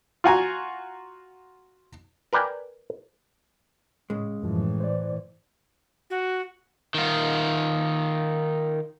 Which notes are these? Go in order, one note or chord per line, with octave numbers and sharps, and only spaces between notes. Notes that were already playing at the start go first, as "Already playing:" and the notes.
F4 F#4 G#5 A#5
A#4 B4 D5 G5 G#5
A2 C#3 G#3
F#2 A2 E3 F3
C5 D5
F#4
D#3 F4